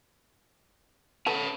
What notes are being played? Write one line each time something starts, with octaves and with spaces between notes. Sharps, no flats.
A3 B3 C#4 A5 B5